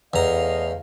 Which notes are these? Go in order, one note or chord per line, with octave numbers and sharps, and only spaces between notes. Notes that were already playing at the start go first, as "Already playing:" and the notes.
E2 A2 D#5 F5 A#5